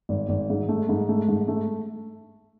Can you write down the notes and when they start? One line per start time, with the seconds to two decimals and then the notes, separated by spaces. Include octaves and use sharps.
0.09 G#1
0.29 G#1
0.50 G#2
0.69 A3
0.89 G#2
1.09 A3
1.28 G#2
1.48 A3